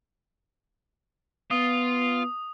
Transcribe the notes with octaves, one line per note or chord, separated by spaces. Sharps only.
B3 F4 D#6